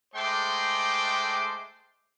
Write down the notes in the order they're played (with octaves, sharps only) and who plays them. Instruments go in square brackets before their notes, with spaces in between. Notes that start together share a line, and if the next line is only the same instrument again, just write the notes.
[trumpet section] G#3 A3 C5 G5 C6 D6